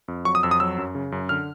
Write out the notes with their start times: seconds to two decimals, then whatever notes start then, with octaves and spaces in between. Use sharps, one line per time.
0.08 F2
0.25 F#3 C#6
0.35 D#6
0.43 F2 E6
0.51 D#6
0.60 F#3 E6
0.78 F#2
0.95 C#3
1.12 F#2
1.29 D3 F6